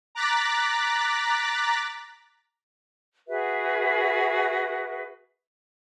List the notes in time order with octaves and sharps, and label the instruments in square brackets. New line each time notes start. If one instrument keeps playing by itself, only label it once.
[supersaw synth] A#5 D6 F#6 A6 B6
[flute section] F#4 G#4 B4 E5